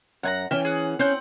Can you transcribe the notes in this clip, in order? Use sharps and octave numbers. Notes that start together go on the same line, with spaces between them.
F#2 F#5 G#5 A#5
E3 C#4 E5 G5 F6
G#4 F#5
C4 C#4 F#5 G6